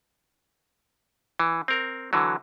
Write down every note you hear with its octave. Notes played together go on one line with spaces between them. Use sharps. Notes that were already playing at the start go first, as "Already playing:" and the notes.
E3
C4 A#4
D3 E3 F#3